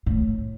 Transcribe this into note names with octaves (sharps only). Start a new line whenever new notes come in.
A2